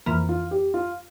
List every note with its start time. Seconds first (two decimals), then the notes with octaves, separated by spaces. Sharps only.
0.06 F2 E3 A#3
0.29 F4
0.51 G4
0.74 F4